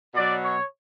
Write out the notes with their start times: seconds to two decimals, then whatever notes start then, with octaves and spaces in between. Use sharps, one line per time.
0.14 B2 F#3 D5
0.43 C#5